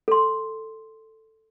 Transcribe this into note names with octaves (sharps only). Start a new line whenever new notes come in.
A4 C6